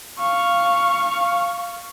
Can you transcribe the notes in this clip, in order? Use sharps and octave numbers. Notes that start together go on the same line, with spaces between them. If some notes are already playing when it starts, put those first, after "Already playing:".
F5 C#6